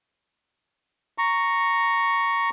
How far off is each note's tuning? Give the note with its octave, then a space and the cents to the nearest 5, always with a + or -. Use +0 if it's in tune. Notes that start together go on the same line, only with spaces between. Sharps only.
A#5 -5 C#6 +0